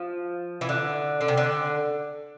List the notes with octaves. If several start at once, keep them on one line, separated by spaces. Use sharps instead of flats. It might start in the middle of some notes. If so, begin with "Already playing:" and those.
Already playing: F3
E3
D3
D3
C3
D3